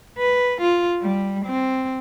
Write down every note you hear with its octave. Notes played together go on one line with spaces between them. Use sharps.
B4
F4
G3
C4